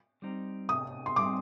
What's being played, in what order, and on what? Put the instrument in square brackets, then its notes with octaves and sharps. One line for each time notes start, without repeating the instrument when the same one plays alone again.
[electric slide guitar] G3 C4 D#4
[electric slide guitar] C3 [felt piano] D#6
[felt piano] C6
[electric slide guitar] G3 C4 D#4 [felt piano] D6